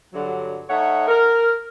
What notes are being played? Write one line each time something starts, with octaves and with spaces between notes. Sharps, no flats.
G2 D3 F#3
A3 D#4 C#5 F#5
A#4